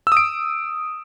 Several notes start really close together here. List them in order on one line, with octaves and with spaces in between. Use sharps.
E6 D#6 D7